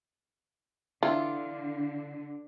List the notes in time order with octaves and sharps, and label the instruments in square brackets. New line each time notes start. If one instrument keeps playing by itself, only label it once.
[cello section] D3 [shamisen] E3 [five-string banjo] F4